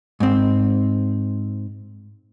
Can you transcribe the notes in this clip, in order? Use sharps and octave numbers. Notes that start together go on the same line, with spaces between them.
G#2 C4